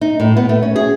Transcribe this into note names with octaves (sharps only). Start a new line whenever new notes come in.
D#4
A2
B3
A3
C#4
G#4